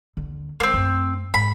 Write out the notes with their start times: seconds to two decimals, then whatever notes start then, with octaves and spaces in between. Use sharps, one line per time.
0.17 D#2 D3
0.60 G#3 A#3 C4
0.74 F#2 A3
1.34 G#2 B5